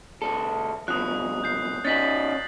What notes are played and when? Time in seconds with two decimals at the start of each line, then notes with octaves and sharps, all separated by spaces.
0.22 C#2 A4
0.88 C2 B2 F3 D#6 F#6
1.44 G6 C7
1.85 C#4 D#4 F#4 A6 B6 F#7